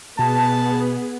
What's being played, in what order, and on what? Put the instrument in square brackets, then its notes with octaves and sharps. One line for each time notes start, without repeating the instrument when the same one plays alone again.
[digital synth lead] B2 [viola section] B3 G#4 [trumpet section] A5